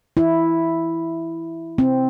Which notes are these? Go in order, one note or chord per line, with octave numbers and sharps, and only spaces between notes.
E4
C4